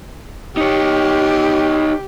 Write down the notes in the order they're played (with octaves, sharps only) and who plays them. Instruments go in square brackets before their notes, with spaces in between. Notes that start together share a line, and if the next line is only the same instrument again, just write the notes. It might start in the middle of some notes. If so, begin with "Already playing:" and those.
[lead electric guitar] D#4 C#5 [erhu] G4